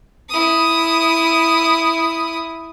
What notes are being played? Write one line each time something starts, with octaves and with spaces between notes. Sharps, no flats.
E4 D#6